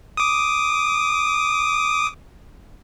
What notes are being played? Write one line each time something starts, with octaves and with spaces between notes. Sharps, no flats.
D6 D#6